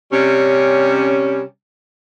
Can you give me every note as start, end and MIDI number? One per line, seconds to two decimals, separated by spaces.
0.12 1.42 48
0.12 1.42 55
0.12 1.42 61